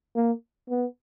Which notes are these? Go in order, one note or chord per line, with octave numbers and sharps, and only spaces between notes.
A#3
B3